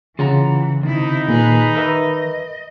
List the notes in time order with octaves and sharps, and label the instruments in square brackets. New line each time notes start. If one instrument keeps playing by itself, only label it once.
[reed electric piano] C#3 [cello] E3 [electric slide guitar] F4 F#5 A#5
[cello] C3 E4 [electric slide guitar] D#3 [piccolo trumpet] D#4
[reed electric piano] A#2 [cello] G#4 B4
[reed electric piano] A#4 B4 E5 [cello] D#5